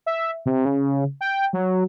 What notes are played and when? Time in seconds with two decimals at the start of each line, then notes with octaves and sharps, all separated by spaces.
0.06 E5
0.46 C3
0.65 C#3
1.21 G5
1.53 F#3